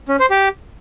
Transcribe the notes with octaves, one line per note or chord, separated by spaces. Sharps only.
C#4
C5
G4